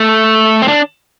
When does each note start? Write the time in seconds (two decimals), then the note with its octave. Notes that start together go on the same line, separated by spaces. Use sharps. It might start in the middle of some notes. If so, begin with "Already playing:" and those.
Already playing: A3
0.62 C4
0.68 D4